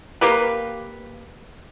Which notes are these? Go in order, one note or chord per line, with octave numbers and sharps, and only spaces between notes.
A#3 G4 B4